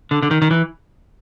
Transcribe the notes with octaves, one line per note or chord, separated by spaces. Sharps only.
D3
D3
D#3
D#3
E3